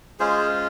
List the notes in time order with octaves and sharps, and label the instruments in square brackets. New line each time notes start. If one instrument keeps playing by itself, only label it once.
[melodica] G#3 C#4 F4 G#4 C5